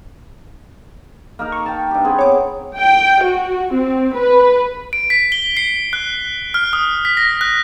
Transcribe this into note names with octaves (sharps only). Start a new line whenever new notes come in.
A#3 D#4 A#4
C#6
G5 A5
G2 G4
B3 C4 G#4
C#5 D6
G5
F#4
C4
B4
D7
B6
G7
C7
F#6
F6
D#6
B6
A#6
F#6